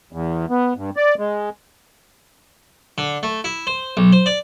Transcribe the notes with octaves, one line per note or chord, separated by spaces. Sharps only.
E2
B3
G2
D5
G#3
D3
A3
E4
C5
B1
C5
D5